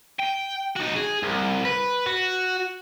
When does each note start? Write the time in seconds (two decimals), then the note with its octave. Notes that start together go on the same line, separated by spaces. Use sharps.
0.19 G5
0.76 D#4 F#4
0.96 G#4
1.23 C2
1.65 B4
2.06 F#4